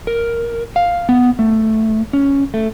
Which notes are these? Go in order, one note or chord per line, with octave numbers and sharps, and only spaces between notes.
A#4
F5
B3
A3
C#4
A3